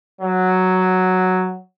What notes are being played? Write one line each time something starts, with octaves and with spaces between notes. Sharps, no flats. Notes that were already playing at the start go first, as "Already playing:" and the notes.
F#3